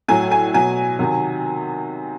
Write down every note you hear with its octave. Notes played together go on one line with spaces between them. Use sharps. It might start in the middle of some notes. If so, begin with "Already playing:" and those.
A2 F#3 G#5
G#5
B2 F#3 G#5
C3 D#3 F#3